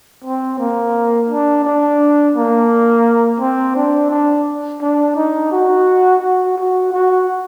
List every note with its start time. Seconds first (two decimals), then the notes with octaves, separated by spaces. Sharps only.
0.24 C4
0.59 A#3
1.29 D4
1.65 D4
2.35 A#3
3.40 C4
3.76 D4
4.10 D4
4.82 D4
5.16 D#4
5.52 F#4
6.21 F#4
6.57 F#4
6.93 F#4